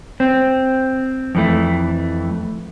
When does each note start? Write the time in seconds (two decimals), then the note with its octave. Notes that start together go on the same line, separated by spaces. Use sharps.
0.20 C4
1.35 F2 E3 A3